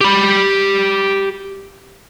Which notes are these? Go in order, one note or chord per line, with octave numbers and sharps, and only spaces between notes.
G4 B5